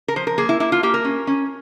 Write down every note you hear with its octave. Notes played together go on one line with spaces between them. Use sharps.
A#4
F3 C5
A#4
A#3 G#4
E4
A#3 E4
F4
A#3 G4
A#4
C#4
C#4